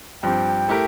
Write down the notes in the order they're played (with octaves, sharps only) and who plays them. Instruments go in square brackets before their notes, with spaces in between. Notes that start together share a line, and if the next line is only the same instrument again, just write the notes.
[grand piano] G2 F3 C4 G4 [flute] G5
[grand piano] A3 E4 G4 A#4